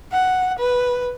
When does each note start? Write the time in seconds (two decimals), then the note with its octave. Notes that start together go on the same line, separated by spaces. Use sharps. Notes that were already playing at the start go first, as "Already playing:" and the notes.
0.12 F#5
0.59 B4